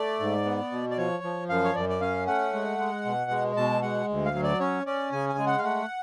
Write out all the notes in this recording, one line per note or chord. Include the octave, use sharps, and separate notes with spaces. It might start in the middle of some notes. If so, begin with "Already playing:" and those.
Already playing: A3 D5
G#2
B3
B2
D5
F3 C#5
F3
F#2 F5
C#5
F#2 D5
D5
C#4 F5
A3 F#5
G#3
G#3
B2
G#3
B2 A5
G#3 F#5
D2
F5
F#3
D5
C#4 C#5
C#4 D5
C#3 G#5
G#5
G#3
F#5
F5
A3 F#5